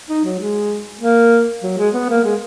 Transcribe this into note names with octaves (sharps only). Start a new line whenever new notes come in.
D#4
F#3
G#3
A#3
F#3
G#3
B3
A#3
G#3